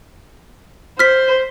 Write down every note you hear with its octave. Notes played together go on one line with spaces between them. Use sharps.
C5 F6 B6